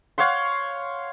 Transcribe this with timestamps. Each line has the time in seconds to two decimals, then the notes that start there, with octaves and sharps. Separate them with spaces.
0.18 C#5 F5 F#5 C6